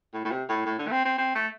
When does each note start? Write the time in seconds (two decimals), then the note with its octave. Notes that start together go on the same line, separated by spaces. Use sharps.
0.13 A2
0.25 A2
0.31 C3
0.49 A2
0.66 A2
0.79 D3
0.87 A3
0.91 C4
1.05 C4
1.18 C4
1.35 A3